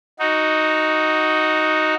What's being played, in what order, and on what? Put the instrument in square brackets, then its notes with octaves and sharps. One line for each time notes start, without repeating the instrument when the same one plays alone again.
[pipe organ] D#4 F#4